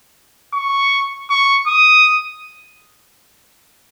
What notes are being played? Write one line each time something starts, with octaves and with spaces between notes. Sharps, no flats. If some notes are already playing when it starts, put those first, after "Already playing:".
C#6
C#6
D#6